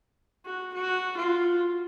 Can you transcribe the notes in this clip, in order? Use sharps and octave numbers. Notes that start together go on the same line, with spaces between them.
F#4
F#4
F4